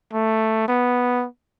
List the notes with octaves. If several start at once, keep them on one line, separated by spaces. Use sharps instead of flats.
A3
B3